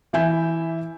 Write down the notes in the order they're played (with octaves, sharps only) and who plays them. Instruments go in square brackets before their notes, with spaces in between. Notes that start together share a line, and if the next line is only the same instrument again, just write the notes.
[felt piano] E3 E4 E5 G#5 G6